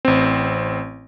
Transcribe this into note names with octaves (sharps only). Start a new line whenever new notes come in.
A1 C4